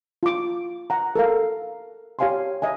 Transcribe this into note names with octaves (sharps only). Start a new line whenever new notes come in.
F4 D6
F#5 A#5
A4 A#4 F5
G4 C#5 F5 G#5 A5 C6
D#5 E5 G#5